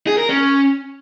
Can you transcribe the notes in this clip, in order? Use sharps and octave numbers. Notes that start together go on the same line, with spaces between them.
G#4
A#4
C#4